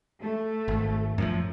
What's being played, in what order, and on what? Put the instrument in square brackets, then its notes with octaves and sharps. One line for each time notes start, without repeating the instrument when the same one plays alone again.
[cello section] A3
[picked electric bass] G#1
F#2 A2 F3